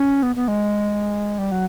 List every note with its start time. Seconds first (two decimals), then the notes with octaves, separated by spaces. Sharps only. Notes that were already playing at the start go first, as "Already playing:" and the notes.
Already playing: C#4
0.23 B3
0.36 B3
0.48 G#3
1.38 G3
1.52 F#3